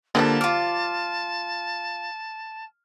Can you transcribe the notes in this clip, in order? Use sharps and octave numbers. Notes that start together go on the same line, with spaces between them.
D3 F3 G3 G#3 A#3 A5
F4 D6 F6